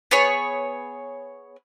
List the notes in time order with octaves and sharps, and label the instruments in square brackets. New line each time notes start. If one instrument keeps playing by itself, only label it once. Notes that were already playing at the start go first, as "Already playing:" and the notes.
[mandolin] B3 G#4 C#5